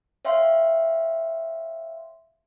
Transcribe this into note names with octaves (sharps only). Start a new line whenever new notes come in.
C#5 E5 F5 G5 C6